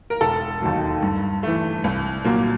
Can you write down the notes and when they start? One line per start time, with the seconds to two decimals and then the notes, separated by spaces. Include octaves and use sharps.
0.10 A#4
0.21 E1 A4
0.62 D#2 D#3 F#3
1.02 G2
1.43 E3 A3
1.84 C2
2.24 A#2 F#3 A#3